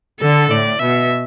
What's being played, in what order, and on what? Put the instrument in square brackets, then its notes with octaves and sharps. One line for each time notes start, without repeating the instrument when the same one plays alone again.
[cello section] D3 [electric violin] A4
[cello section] A2 [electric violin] D5
[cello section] B2 [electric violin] E5